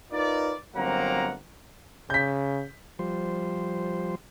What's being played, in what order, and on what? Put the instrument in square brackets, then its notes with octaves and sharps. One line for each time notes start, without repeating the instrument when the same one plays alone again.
[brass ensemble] D#4 F4 A#4 B4 D5
G1 F#3 A#3 C4 F#5 A#5
[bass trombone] C#3 [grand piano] G6 B6
[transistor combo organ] F3 G3 C5